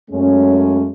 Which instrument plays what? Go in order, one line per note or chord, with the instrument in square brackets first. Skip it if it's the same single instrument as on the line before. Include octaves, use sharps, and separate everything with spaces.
[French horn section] F#2 G#3 A3 C#4